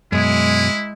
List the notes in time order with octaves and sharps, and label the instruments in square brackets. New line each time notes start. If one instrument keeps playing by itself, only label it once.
[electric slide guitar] F#2 B2 [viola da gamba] G#3 [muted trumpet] E4